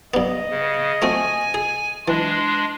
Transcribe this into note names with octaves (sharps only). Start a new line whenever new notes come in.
G2 B3 D#5
C#3
A3 C4 F#4 G#5
G#4
E3 G#3 D4 C6